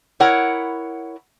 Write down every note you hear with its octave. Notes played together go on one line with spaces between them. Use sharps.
E4 A#4 C#5 F#5